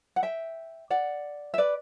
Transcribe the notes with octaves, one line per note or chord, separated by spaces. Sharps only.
F#5
E5 G5
D5 F#5
E5
B4 D5